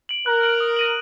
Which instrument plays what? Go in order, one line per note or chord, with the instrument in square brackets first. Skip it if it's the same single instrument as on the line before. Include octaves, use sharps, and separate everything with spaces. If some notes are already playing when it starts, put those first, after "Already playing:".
[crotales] D7 F#7
[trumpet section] A#4 [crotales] F#6
[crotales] D7 F#7
D#6
A#6 D#7 F#7